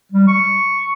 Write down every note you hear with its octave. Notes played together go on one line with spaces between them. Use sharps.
G3
C#6